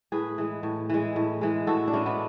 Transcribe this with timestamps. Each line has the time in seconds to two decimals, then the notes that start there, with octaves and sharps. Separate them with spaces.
0.12 A2 G#4 B4
0.38 E3 G#3
0.63 A2
0.90 E3 G#3
1.16 A2
1.41 E3 G#3
1.67 A2 F#4 A4
1.88 D4
1.93 E3 G#3 C#4 E4
2.06 B3 D4